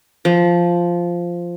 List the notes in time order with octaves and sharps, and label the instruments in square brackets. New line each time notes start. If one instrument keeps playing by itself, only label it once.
[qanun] F3